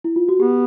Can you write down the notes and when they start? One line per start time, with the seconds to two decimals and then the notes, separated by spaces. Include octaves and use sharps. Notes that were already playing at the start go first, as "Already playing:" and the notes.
0.04 E4
0.16 F4
0.29 F#4
0.40 B3 G4